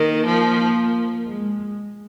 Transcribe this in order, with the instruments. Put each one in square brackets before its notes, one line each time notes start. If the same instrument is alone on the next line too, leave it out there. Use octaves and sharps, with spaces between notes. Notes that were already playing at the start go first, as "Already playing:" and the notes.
Already playing: [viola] D#3 [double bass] A#3
[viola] F3
[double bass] G#3